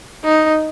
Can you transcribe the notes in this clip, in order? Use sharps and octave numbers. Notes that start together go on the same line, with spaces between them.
D#4